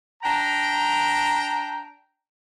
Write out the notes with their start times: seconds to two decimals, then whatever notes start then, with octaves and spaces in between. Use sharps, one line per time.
0.23 D4 G5 A#5